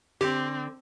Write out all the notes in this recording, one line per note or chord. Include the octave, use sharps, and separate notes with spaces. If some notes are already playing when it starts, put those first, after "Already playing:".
D3 C4 G4